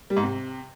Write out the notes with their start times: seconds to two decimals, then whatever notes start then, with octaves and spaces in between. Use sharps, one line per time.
0.10 G3
0.17 G#2
0.23 C3